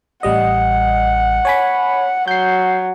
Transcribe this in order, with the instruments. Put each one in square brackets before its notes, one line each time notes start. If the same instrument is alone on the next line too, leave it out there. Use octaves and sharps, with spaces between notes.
[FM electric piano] A1 G3 D#5 [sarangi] F#5
[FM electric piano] C#5 G#5 B5
[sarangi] F#3 [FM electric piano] G6 C7